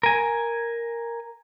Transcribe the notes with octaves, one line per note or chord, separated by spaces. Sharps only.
A#4 G#5